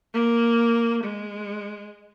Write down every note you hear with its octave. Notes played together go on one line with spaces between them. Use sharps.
A#3
G#3